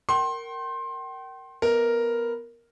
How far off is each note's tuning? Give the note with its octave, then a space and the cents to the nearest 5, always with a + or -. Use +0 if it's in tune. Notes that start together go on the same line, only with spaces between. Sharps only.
A#4 -10 G5 -40 C6 +25
B3 +0 A#4 +0 D#5 +25